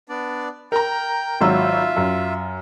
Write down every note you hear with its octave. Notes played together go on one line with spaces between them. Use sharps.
B3 D4 D5
A#4 G5 A#5
G#1 F#3 F4 E5 E6
F#2